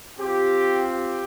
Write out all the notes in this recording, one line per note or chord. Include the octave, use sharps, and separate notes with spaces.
C4 F4 G4
G4